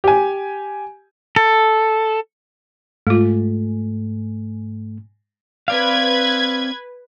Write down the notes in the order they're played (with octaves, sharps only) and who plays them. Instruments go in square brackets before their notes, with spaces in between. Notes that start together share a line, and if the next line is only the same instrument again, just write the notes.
[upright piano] G4 G#5
[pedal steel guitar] A4
[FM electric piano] G#2 [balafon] G#3 F4 [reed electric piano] A3
[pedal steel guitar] C4 D5 F5 [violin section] B4 G#6